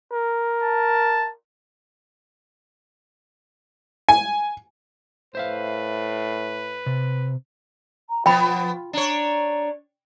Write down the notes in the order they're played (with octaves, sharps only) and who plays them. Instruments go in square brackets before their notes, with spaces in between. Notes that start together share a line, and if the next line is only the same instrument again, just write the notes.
[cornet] A#4
[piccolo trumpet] A5
[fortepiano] G#5
[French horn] A2 [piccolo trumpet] B4 [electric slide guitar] C5 E5 F5
[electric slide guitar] C3
[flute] A#5
[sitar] F3 B3 [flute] F4 [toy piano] G5 B5
[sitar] D4 C#5 [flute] A#5